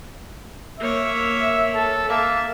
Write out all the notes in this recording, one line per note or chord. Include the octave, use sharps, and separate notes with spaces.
A#3 C#5 E5
A4
A#3 E5